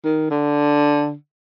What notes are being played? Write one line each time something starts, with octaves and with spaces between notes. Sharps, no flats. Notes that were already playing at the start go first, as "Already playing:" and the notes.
D#3
D3